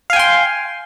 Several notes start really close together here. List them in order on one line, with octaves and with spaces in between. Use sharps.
F5 G#5 G5 C6